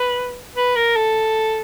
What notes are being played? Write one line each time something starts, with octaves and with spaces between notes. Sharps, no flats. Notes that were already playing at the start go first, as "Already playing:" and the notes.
Already playing: B4
B4
A#4
A4